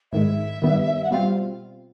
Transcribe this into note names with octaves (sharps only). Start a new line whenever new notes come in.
G#2 D#3 G#3 E5
G2 D#3 G3 B3
F#5
B2 G3 C4 F4 F5